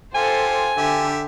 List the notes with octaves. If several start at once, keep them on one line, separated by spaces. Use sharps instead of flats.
F4 G4 A4 C5 G#5
D3 G4 E5